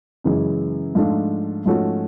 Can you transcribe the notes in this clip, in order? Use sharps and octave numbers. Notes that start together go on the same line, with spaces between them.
F#2 C#3 E3 G#3
G#2 F3 A3 D4 F4
G#2 F3 A3 C#4 F#4